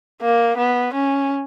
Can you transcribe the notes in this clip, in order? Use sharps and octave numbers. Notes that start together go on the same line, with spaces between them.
A#3
B3
C#4